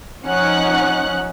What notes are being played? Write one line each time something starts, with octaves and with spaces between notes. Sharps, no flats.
F3 C#4 D#4 F#5 F#6